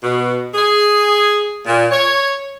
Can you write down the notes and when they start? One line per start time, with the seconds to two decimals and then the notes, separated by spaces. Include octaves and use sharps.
0.02 B2
0.54 G#4
1.64 A#2
1.90 C#5